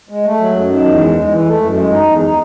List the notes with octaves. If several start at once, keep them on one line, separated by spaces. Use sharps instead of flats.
G#3
A3
F#3
F#2
D#3
E2
G#3
G#3
E3
A3
F#2
G#3
D#4
E2
D#4